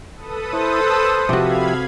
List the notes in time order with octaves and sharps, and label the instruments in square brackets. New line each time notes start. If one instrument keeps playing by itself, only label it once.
[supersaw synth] A4 B4 D#6
[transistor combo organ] E4 [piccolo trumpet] C5
[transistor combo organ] E6
[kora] C3 F#4 [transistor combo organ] F3 G4 E5 [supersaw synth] F5 B5 G#6